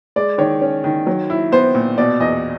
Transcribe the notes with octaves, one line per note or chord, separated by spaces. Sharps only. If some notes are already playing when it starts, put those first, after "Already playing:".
G#3 D5
D#3 C#5
C#4
D#3
F#3
E4
B3 C5
A#2
B2 D5
E2 D#5